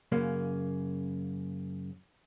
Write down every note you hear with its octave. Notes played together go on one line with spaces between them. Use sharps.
F#2 C#3 A#3 C#4